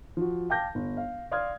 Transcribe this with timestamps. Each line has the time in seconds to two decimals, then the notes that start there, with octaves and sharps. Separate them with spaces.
0.17 F3 F#4
0.50 F5 G5 A5 D6 G6 A#6
0.75 G1
0.97 F5
1.31 D5 F5 C6 D#6 F6 G#6